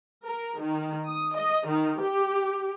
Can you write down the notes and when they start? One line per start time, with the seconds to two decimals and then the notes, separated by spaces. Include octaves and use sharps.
0.23 A#4
0.58 D#3
1.05 D#6
1.36 D#5
1.67 D#3
2.00 G4